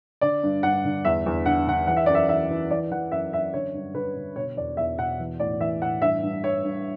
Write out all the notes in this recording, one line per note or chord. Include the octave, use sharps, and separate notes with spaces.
D3 D5
G2
G2 F#5
D3
E2 E5
E2
D3 F#5
D3 F#5
E3 F#5
E5
F#2 D5
E5
E3 E5
E3
E3 D5
E3 F#5
F#2 E5
F#2 E5
D3 C#5
G2
D3 B4
D3
B2 C#5
E2 D5
E2 E5
B2 F#5
E3
A2 D5
E3 E5
A2 F#5
G2 E5
G2
G2 C#5
G2